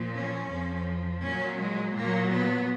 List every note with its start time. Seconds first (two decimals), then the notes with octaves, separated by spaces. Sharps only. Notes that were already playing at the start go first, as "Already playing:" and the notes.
Already playing: A#2 F3
0.15 C#4
0.50 F2 F3
1.23 A#2 F#3 C#4
1.59 G#3
1.95 A#2 F#3 A#3
2.31 B3